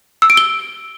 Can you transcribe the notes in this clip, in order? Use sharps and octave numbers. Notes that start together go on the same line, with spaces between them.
E6
D7
G7